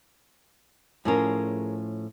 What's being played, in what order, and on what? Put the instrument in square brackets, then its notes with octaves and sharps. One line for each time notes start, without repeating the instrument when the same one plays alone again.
[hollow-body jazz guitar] A2 F3 C#4 [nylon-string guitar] G#4 A#4